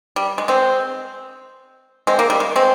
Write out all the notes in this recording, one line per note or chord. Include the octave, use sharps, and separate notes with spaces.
G3
G#3
G#3 C4
G#3 C4
A#3
G3
G#3
G#3 C4